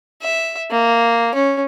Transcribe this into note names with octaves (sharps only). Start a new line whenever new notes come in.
E5
A#3
C#4